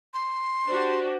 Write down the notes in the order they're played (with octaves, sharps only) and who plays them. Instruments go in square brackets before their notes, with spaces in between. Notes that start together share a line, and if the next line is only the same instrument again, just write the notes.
[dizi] C6
[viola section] D4 F#4 G4 [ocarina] C5